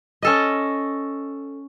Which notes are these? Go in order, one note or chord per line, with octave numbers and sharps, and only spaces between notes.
C#4 A4 D#5